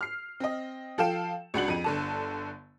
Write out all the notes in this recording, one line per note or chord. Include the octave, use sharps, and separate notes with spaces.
F6 C7
C4 D#5
F3 A4 F5 G5 E7
C#2 D4 F#4 F#7
F2 D#7
G1 D3 A5